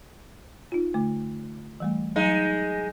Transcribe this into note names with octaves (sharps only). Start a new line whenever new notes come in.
D#4 F4
D3 A3
E3 G3 A3
F#3 G#3 D#4